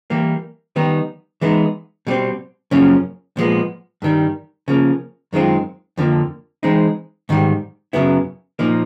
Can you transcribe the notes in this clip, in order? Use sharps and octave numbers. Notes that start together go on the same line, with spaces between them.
E3 G3 A#3
D#3 G3 B3 D#4
E3 G#3 B3 D#4
B2 G3 C4
F#2 C#3 F3 A#3 C#4
A#2 F3 G#3 B3
G2 D#3 G3
C#3 F3 A#3
F#2 D#3 G#3 C4 F4
F2 D3 F3 A#3
E3 G#3 C4 D#4
G#2 D#3 G3
F#2 C#3 F#3 B3 E4
A#2 F3 A#3 D#4